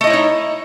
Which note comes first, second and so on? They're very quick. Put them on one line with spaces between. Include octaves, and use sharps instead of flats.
A3 D#5 E4 C#5 D#4